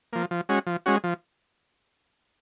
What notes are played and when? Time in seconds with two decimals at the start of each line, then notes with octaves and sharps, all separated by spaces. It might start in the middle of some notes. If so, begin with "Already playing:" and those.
0.13 F3 A#3
0.31 F3
0.49 G#3 C#4 F#4
0.67 F3
0.86 G#3 C#4 F#4
1.04 F3